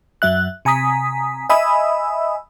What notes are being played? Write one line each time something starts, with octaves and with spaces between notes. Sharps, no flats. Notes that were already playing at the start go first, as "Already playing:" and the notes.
F#2 F#3 E5 F#6
C3 G#5 A#5 D#6 B6
D#5 E5 G#5 B5 D#6 E6